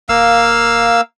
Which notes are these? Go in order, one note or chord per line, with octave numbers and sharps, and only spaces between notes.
D1 A#3 F5 E6